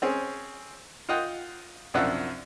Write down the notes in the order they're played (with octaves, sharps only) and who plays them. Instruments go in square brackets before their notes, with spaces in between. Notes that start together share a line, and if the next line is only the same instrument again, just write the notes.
[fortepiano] C4 C#4 G#4
F4 D#5 F#5 G5
C2 F#2 F3 D4 E5 F#5